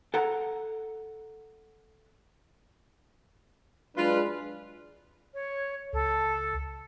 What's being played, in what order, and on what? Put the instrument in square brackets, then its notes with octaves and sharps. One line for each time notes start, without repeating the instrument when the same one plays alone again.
[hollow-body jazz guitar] A4 F#5 A#5
[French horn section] F#3 G#3 D4 [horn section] F4 B4
[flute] C#5
[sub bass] C#2 [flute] A4